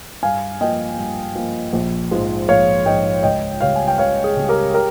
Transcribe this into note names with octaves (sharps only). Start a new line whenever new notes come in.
G2 F5 G#5
F3 A#3 D#5 G5
G2
F3 A#3
A#1
G#2 F3 G#3
A#1 C#5 F5
G#2 F3 G#3 D#5 G5
C#2 D#5 G5
C#3 G3 C#5 F5
G#5
G5
C#2 C#5 F5
G#4
C#3 G3
G4 A#4
G4 A#4